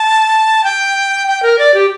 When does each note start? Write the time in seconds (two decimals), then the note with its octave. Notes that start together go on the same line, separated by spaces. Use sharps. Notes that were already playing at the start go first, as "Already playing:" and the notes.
Already playing: A5
0.64 G5
1.27 G5
1.43 A#4
1.59 D5
1.74 G4